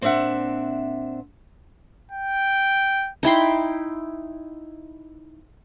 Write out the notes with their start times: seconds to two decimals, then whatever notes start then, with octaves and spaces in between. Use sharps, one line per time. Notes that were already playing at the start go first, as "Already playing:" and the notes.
0.01 A#2 C4 D4 F4 E5 F#5
2.12 G5
3.23 D#4 E4 G5 C6